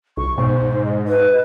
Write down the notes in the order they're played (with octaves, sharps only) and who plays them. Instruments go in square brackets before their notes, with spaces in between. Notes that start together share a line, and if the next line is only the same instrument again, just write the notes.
[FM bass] C2 [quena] C#6
[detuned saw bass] G#2 [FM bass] B2 [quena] C5
[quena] D#5
[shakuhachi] B4